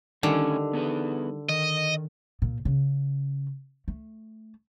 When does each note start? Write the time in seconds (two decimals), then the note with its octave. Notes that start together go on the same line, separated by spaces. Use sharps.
0.23 D3 D#3 G3 A3 C#4 G#5
0.73 B3 G#4 B4
1.49 D#3 D#5
2.42 A#2
2.65 C#3
3.88 A3